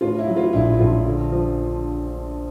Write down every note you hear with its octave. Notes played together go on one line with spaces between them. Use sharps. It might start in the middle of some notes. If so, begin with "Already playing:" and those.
A2 F4
E4
F#3
F4
A#1 E4
A#1 F4
D3
F3